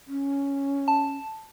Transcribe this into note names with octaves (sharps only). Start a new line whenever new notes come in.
C#4
A5